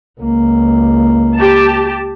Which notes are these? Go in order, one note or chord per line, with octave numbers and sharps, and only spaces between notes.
C#2 A#3
G4 A5